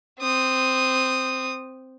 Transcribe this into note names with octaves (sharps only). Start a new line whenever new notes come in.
C4 D#6